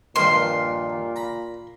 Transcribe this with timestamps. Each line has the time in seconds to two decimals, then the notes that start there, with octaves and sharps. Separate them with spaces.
0.16 G2 A#2 D#3 F3 C6
1.16 A#5 B5